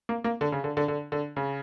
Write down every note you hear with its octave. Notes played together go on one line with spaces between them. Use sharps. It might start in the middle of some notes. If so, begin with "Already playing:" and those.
A#3
A#3
D3
C#3
D3
D3
D3
D3
C#3